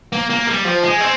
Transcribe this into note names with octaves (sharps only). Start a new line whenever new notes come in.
A#3
A#3
G3
F3
G#3
C4